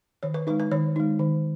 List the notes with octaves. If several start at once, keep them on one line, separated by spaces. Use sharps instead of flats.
D#3 C#5
B4
G#3 D#4 B4
B4
D#3 C#5
G#3 D#4
D#3